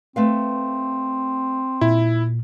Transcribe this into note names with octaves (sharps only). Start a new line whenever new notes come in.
A3 C4 B4 F5
A#2 E4